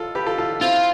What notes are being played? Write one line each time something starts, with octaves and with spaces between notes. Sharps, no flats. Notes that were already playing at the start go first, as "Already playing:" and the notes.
Already playing: F4 A4
G4 B4
F4 A4
F4 A4
C4 E4 F4